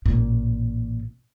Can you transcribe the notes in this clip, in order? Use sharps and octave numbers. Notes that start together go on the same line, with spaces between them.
A1 A#2